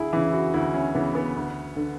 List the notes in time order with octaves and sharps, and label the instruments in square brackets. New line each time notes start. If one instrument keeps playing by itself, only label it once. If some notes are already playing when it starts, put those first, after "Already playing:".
Already playing: [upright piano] D2 E4 G#4
C#3 E3 E4
F#4
D2 E4
C#4
C#3 E3 B3
B3
D2
D3